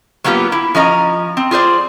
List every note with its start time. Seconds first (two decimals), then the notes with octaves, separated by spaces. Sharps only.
0.24 F#3 A#3 B3 F4 G4
0.52 E4
0.75 F3 C#4 D#5 A#5
1.37 C4
1.51 F4 G#4 C5 D5